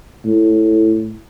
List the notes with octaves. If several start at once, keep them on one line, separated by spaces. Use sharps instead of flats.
A2